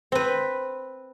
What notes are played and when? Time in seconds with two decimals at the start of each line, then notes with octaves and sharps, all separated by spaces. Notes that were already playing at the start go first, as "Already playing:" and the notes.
0.12 C4 B4